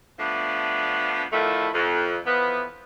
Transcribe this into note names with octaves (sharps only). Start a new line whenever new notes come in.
F3 A3 B3 D4
D3 D#3 F3 A3 E4
F2
E3 F3 B3